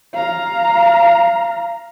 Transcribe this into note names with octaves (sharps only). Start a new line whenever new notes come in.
F5 A#5